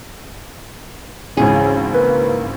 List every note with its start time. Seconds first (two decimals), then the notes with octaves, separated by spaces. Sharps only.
1.37 G#1 C#2 C#3 E3 G#4
1.94 A#3 B4